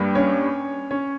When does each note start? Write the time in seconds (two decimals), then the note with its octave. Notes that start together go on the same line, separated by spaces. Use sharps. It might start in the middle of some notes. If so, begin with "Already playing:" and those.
Already playing: G2 G3 A#3
0.15 C#4 C#5
0.91 C#4 C#5